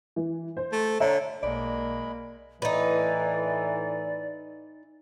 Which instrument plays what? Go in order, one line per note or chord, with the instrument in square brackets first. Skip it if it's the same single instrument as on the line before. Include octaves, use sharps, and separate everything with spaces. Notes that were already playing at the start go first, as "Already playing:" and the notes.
[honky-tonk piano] E3
C5
[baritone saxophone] A3
[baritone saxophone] D3 [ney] C#5 [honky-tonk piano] E5 A#5
[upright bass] B1 [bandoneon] G#3 B5 [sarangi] A#3 [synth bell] D5
[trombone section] A2 E3 [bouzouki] D#4 B4 [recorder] D5